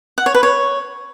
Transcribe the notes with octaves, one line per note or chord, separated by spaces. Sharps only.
F#5
C#5
B4
C#5